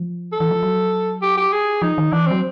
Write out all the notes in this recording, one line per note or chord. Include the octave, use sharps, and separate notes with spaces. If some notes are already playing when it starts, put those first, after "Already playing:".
Already playing: F3
A4
E3
F3
F#3
G4
G4
G#4
F3 D#4
D#3
E3 D4
F#3 C4